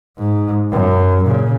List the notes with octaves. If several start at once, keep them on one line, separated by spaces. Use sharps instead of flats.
G#2
F#2
A#2 C#3